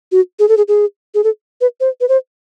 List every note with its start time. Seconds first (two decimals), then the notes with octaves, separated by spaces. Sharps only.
0.12 F#4
0.39 G#4
0.49 A4
0.57 G#4
0.68 G#4
1.14 G#4
1.24 A4
1.61 B4
1.80 C5
2.01 B4
2.09 C5